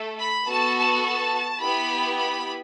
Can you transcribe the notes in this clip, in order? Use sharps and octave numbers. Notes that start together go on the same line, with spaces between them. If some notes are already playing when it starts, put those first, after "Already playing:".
Already playing: A3 A4
B5
B3 F#4 A4 A5
A5
A5
B3 E4 G4 B5
B5